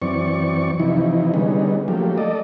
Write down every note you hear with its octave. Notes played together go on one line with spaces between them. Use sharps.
F#2 E3 C4 D5 C#6
C3 E3 F3 D#4 E4
D3 G3 G#3 B3 C#4 D#4
F3 F#3 A3 A#3 G4
A4 D5 D#5